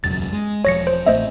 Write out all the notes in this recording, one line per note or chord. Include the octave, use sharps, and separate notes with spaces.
E1 C#2 F#2 A6
G#3
E1 F3 C#5 A#6 C#7
C5
A1 A3 C4 C5 D#5 E5